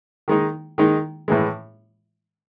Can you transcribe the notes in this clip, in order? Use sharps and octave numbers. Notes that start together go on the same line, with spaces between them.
D#3 G#3 D#4
D#3 G#3 D#4
A2 E3 G#3